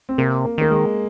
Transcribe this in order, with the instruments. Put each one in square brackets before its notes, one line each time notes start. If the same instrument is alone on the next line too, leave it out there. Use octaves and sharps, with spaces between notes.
[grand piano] C4
[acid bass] C3 [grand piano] A#3
[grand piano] A#3
[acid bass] D#3 [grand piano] A#3
[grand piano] G#3